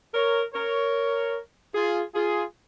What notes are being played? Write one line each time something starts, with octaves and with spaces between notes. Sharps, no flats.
A#4 C#5
A#4 C#5
F4 G#4
F4 G#4